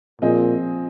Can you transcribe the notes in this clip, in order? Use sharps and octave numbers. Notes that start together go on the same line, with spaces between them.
A#2 F3 C4 G#4 D#5